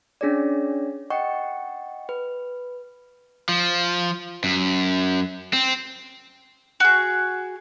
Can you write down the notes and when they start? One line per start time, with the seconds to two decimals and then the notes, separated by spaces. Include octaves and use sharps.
0.21 C#4 D4 G#4 C#5 D5
1.10 D#5 F#5 G5 C#6
2.09 B4
3.49 F3
4.44 F#2
5.53 C4
6.80 F#4 G#4